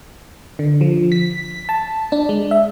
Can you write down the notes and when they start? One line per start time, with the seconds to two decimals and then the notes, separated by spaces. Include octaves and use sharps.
0.59 D3
0.81 F3
1.12 B6
1.69 A5
2.12 D4
2.29 G#3
2.51 E5